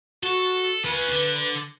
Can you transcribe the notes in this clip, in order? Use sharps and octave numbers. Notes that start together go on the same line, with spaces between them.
F#4 A4
C#4 F4 B4
D3